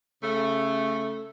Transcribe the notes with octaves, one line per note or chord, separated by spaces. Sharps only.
C#3 A3